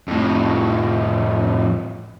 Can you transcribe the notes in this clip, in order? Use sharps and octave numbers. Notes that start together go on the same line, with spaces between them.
F2 A2